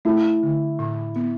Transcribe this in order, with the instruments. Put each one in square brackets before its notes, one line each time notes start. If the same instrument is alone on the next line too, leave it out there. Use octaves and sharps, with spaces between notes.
[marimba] A3 [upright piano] E4
[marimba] D3
A2
B3